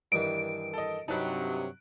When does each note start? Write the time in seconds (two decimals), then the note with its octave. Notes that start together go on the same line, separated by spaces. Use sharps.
0.12 G2 D#3 E3 D7
0.74 A4 D#5
1.08 G2 C3 F#3 D#4 A5 B5 F#6